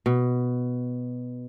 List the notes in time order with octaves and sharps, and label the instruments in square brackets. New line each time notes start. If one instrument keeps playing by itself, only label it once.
[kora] B2